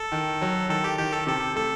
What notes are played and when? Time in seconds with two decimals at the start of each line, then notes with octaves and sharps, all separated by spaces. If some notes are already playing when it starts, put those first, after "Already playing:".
Already playing: A4
0.12 D#3
0.42 F#3
0.69 D#3 A4
0.84 G4
0.98 D#3 G4
1.13 A4
1.27 C3 A4
1.56 A3 A4